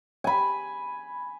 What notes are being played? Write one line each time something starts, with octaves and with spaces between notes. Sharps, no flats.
G#5 B5